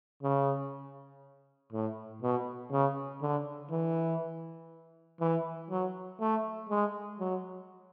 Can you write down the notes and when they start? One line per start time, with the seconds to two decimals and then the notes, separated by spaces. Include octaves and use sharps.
0.23 C#3
1.72 A2
2.22 B2
2.71 C#3
3.22 D3
3.71 E3
5.21 E3
5.71 F#3
6.20 A3
6.70 G#3
7.20 F#3